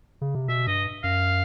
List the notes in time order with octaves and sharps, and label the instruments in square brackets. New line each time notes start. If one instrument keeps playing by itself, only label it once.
[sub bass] C#3
C3
[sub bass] B2 [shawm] E5
[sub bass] G2 [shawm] D#5
[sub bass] F#2 [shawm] F5